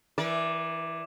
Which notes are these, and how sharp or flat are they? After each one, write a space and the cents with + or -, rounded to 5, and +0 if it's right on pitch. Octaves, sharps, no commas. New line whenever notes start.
E3 +0 A#4 +40 D5 +0